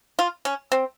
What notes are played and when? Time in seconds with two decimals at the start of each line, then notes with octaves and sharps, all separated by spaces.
0.19 F4
0.45 C#4
0.72 C4